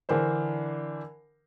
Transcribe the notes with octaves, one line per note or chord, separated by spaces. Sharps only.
D3 E3 D4 A#4 C5